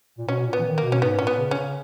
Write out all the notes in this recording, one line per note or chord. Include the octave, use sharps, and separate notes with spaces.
A#2
B2 C#4
A#2
B3
E3
D#3
A#3
B2
C#4
G#2 B3
A#2 C#4
B3
C#3
C#4
C#3